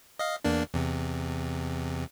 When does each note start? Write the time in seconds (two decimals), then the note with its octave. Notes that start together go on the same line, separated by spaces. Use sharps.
0.19 D#5 F5
0.45 E2 A#3 D4
0.74 E2 C3